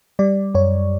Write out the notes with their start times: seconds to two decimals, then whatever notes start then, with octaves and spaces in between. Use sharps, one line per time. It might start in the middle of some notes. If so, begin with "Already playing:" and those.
0.19 G3 D5
0.55 F#2 C#5